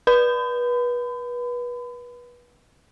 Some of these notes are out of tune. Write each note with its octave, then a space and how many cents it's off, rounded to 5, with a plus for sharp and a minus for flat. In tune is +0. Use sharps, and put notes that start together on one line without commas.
B4 -25 B5 +40